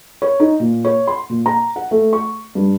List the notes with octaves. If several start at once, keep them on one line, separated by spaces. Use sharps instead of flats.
C#5
D#4
A#2
C#5
C6
A#2
A#5
F#5
A3
C#6
G2